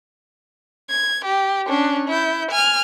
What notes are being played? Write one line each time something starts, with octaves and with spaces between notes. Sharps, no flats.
G#6
G4
C#4 D4
E4 G6
G#5 F6